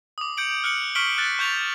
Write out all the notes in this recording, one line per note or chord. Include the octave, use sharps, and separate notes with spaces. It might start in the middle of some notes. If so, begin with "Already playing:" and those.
D6 D#6
G6 C#7 D7 F#7
F6 F#6 C#7 F#7
C#6 F6 B6 D7 F#7 G7
F6 F#6 A6
C#6 G6 F7